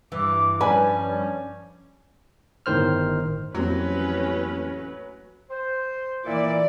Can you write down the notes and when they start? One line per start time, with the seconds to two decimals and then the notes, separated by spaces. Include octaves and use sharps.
0.12 G2 E3 D6
0.61 F3 G3 C#4 D4 B4 G#5
2.66 G1 A2 D#3 C5 F6
3.55 A1 F2 F#3 A#3 C4 C#4 B4
5.50 C5
6.25 A#2 E3 E4 D5